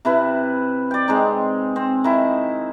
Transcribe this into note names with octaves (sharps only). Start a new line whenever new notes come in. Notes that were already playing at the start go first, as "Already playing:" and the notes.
C3 E4 B4
D5 G5
G#3 C4 D#4
C4
D#3 E4